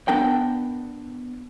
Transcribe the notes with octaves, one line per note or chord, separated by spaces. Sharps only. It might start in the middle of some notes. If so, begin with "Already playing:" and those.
B3 D4 A#4 G5